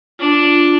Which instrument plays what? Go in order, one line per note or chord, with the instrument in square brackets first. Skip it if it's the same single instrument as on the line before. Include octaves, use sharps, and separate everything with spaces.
[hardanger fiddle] D4 [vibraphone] F4